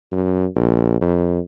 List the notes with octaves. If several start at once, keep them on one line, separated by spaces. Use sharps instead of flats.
F#2
A#1
F2